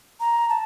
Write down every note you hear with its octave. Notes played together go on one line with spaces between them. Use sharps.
A#5
A5